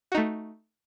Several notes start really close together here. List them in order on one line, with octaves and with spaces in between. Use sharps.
F#4 D#4 A3